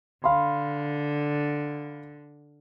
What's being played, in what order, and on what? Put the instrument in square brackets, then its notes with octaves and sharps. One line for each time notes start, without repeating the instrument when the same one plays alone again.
[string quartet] D3 [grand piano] F5 B5 C6